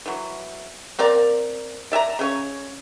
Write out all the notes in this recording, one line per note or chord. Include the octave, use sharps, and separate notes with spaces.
E3 F#3
A#3 C4 A#4 D5
D5 E5 G#5 A#5
C#3 C#4 C#5